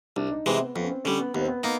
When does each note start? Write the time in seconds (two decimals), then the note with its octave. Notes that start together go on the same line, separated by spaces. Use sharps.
0.16 C2 D4
0.31 D#4
0.46 C3 E3 G#3 C4
0.61 B3
0.75 F2 B3
0.84 C#4
0.90 C4
1.05 D3 G3 C#4
1.19 B3
1.34 D#2 B3
1.41 C4
1.48 B3
1.63 A#3 B3 D#4